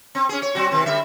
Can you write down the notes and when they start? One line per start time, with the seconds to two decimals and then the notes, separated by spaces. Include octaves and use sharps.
0.15 C4
0.29 C#4 G#4
0.42 C#5
0.55 F#3 C4 F#4
0.71 C3 D#3 C4
0.86 D3 G3 E5